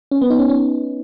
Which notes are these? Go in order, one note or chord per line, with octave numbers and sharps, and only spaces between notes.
C#4
B3
D#4
C#4
C#4